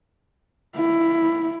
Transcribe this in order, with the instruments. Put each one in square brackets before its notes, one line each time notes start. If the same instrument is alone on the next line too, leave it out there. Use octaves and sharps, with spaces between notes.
[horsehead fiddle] E4